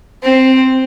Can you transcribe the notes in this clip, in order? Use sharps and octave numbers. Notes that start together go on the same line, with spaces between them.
C4